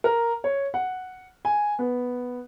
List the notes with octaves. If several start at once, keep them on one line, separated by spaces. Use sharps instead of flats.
A#4
C#5
F#5
G#5
B3